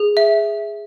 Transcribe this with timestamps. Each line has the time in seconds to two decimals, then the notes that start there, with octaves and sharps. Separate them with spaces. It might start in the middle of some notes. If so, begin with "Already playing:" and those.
Already playing: G#4
0.17 E5